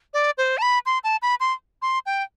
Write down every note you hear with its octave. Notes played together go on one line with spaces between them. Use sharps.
D5
C5
A5
B5
C6
A5
B5
C6
C6
G5